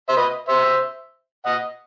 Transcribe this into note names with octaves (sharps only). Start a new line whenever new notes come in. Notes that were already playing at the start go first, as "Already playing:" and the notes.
C5 E5
B4 D#5
C5 E5
D#5 F#5